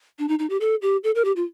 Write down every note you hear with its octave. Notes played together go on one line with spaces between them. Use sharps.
D4
D#4
D#4
G4
A4
G4
A4
A#4
G4
F4